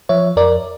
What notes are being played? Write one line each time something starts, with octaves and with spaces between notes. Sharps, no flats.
F3 C#5 E5
F2 A#4 D5